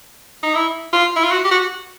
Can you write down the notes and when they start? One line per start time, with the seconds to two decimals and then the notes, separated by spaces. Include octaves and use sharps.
0.43 D#4
0.54 E4
0.93 F4
1.16 E4
1.24 F4
1.32 F#4
1.44 G4
1.51 F#4